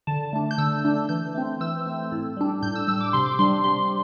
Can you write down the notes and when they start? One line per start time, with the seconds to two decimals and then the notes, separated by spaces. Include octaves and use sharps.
0.07 D3 A5
0.33 A3 D4
0.51 G6
0.58 D3 E6
0.84 A3 D4
1.09 E3 G6
1.35 A3 C4
1.60 E3 E6
1.86 A3 C4
2.12 A2
2.37 G3 D4
2.63 A2 G6
2.75 E6
2.88 G3 D4 E6
3.01 D6
3.13 C3 C6
3.26 D6
3.39 G3 D4 C6
3.64 C3 C6